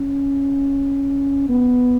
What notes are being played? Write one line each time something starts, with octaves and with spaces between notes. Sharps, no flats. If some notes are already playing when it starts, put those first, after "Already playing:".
Already playing: C#4
B3